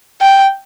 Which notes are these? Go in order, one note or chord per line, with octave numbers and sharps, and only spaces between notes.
G5